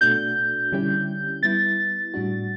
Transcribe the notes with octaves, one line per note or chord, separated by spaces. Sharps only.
B2 A3 D4 F#4 G6
D3 G3 C#4 E4 G4
G3 B3 E4 A6
A2 G3 D4 F#4